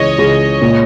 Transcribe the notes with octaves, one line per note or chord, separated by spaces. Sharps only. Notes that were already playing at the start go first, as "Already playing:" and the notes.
Already playing: C#2 E3 C#5 D#5
C#2
A#2